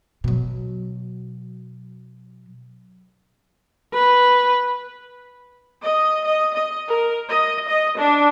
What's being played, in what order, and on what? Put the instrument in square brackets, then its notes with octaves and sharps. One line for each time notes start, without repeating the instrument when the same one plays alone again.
[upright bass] B2 F#3
[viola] B4
[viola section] D#5
D#5
D#5
A#4
D#5
D#5
D4